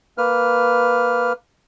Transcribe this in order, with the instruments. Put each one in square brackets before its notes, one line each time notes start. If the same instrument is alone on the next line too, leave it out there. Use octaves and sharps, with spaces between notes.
[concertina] A#3 B4 F6